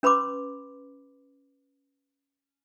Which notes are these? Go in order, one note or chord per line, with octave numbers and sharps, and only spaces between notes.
C#4 B4 B5 C6 D6